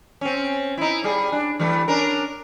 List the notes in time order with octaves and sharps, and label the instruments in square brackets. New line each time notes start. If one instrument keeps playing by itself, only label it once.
[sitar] C4 C#4
D#4 E4
G3 G#4
D4
E3 G3 A3
C#4 D4 A#4